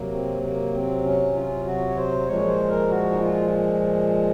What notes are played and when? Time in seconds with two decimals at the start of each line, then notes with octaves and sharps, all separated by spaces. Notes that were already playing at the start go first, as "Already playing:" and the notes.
Already playing: C3 F#3 A#3
0.11 C4
0.43 A#3
0.73 C4
1.04 C#4
1.34 F4
1.65 F#4
1.89 C#5
1.96 C5
2.27 A#2 F3 G#3 C#5
2.47 C5
2.68 A#4
2.88 F#4
3.11 D#4
3.20 F4